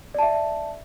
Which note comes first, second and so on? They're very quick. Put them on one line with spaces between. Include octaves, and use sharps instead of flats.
D5 A5 E5